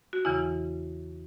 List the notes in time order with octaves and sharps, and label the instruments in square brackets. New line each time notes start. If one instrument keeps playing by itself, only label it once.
[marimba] F#4
E2 C#3 E3 E4